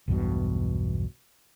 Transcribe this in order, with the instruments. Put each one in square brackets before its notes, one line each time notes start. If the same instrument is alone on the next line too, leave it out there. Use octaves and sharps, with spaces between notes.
[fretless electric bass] B1 E2 G2 B2